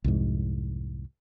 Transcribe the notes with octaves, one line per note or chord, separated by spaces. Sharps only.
C2 F2 G#2